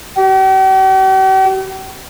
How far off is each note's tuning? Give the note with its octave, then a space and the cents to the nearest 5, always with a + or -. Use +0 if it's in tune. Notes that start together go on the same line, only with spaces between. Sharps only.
G4 -45